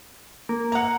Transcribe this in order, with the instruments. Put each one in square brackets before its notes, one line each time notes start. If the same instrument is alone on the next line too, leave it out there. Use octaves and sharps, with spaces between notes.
[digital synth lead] A#3
[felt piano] F#5 A#5